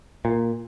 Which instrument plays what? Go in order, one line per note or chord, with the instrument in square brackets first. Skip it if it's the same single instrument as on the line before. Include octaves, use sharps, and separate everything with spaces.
[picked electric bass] A#2